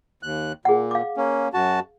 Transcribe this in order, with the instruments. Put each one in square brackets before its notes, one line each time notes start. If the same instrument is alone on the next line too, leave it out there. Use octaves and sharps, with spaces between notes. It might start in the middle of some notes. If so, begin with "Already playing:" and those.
[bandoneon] D#2 F#6
[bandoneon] A#2 [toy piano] G#4 F#5
[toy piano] F5 D6
[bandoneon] A#3 C#4
F#2 F#4 A5